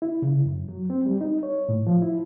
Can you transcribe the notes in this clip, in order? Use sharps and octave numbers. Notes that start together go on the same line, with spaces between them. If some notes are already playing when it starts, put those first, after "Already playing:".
E4
C#3
F#2
F#3
C4
G3
D#4
C#5
A2
F3
E4